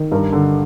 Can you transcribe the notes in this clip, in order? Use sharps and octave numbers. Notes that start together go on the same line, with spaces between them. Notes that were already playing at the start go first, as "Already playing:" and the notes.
Already playing: D#3
G2 A#4
D3